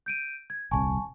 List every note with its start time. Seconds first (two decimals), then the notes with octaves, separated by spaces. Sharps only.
0.06 G6 D7 D#7
0.50 G#6
0.71 D#1 C2 C3 G#5 A5 C#6